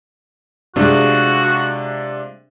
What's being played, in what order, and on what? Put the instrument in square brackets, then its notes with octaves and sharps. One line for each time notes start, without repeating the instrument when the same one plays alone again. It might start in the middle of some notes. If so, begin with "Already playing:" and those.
[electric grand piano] C3 D4 [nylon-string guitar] G#3 F4 [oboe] F#4